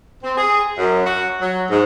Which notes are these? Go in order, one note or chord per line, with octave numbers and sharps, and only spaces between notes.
C4
G#4
F#2
F#4
F#3
G#2